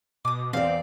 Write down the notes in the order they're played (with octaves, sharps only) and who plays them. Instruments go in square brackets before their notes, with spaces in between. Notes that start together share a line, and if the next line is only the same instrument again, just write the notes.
[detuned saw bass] B2 [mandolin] D6 D#6
[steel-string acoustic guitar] E2 D5 [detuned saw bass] C4 [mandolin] F5